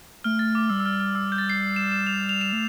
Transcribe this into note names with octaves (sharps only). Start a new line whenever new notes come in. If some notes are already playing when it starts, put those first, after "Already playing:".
A3 F6
A6
D6
G3 E6
E6
F6
F6
E6
G6
A6
C7
E7
E7
F7
F7
E7
A3